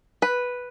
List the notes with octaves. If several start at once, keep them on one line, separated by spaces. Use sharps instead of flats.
B4